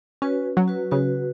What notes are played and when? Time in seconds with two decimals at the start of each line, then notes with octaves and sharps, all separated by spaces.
0.22 C#4 F#4 B4
0.57 F#3
0.68 F#4 B4
0.91 C#3 F#4 B4